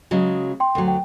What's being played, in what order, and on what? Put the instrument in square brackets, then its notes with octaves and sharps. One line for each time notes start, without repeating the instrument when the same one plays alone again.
[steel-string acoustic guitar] C#3 F#3 G#3
[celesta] G5 C6
[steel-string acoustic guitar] D2 F#3
[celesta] G5